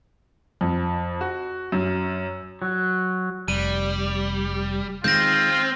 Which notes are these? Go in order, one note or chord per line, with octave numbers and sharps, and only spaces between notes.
F2
F#4
F#2
F#3
F1 G3 D#7
D#3 G#3 C4 F4 G6 A#6